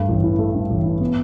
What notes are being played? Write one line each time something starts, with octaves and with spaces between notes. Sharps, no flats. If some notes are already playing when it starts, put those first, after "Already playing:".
Already playing: G2 A3
A1
E3
A3
G2
A1
E3
B3